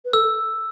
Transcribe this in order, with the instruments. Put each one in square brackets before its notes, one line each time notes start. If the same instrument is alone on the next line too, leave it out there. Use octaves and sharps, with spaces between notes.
[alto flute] B4
[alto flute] A4 [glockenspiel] E6